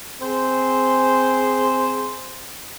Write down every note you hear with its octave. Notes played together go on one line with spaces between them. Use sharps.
C4 G#4 C5